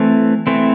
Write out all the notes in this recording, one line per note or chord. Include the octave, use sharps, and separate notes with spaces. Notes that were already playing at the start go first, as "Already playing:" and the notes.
Already playing: E3 A3 C4
E3 A3 C4